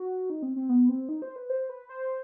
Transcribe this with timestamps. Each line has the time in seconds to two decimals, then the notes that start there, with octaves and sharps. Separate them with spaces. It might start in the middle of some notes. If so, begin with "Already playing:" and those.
Already playing: F#4
0.30 D#4
0.42 C4
0.56 C4
0.69 B3
0.89 C4
1.09 D#4
1.22 C5
1.36 B4
1.50 C5
1.69 B4
1.89 C5